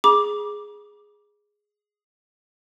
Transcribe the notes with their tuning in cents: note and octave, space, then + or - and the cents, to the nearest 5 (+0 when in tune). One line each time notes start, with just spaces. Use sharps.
G#4 +0 B5 -45 D6 +0